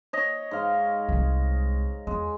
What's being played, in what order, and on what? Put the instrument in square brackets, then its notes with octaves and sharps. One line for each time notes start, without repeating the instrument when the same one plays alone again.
[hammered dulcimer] C#5 D#5
G#2 F5
[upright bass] C2 G#3
[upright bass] E2 [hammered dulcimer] G#3